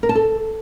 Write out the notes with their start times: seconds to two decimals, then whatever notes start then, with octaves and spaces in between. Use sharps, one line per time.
0.03 A#4
0.09 A5
0.15 A4